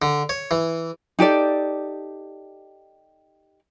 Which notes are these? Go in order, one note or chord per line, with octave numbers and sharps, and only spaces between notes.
D3
C#5
E3
D#4 G4 A4 D5